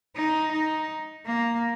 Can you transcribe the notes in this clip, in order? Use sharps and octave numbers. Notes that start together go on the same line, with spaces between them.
D#4
D#4
A#3